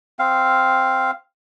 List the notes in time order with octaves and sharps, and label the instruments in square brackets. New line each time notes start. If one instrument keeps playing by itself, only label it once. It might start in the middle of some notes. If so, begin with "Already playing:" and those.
[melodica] C4 F5